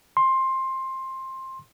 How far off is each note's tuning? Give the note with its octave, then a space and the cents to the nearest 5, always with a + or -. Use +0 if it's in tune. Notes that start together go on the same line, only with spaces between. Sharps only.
C6 +15